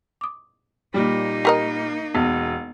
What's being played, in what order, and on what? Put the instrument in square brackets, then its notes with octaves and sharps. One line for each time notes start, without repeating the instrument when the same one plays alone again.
[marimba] D6 D#6
[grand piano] A#2 G3 [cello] A#3 D#4
[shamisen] G4 A#4 D#5
[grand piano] E1 [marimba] B3